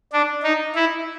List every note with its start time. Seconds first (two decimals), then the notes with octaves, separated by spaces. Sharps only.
0.13 D4
0.43 D#4
0.75 E4